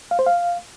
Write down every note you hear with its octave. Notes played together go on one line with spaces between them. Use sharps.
F5
C5
F5